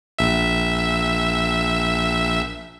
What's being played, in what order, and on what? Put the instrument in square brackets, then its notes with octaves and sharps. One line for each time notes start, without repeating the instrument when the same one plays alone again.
[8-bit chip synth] A#1 E5